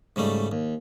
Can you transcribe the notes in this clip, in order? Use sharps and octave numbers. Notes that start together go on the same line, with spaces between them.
G#2 C#3 G3 A3
D#2